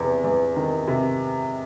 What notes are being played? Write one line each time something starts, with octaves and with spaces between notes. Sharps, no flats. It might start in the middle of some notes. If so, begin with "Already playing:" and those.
Already playing: E2 C3
E2
D#3
C3